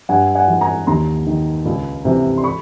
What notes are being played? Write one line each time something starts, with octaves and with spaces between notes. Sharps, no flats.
G2 F#5 G#5
F#5 G#5
E3
G#5 A#5
D#2 A#5 C6
D#3
C#2
C3 E3
C6
B5 C#6